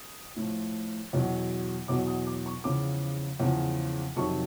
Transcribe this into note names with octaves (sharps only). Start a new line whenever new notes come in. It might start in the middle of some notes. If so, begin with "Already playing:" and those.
Already playing: D#6
A2 F3
E2 B2 F#3
E2 B2 F#3 D6
D#6
D6
C#6
E2 C#3 F3 D6
E2 C#3 F3
F2 C3 D#3 F#3 C#6